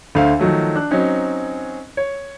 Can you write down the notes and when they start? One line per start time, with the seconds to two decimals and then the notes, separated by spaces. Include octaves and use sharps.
0.15 D2 D3 C5 E5 F5
0.39 D#3 F3 F#3 A3
0.76 D4 F#6
0.91 F#3 C4 C#4 D#4
1.97 C#5